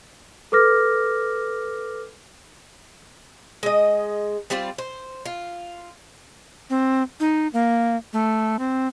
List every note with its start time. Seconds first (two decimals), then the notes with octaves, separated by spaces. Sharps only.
0.52 A4 B4 D6 F6 A#6
3.63 G#3 D#5
4.50 G3 C4 F4 D5
4.78 C5
5.25 F4
6.70 C4
7.20 D#4
7.53 A#3
8.13 A3
8.59 C4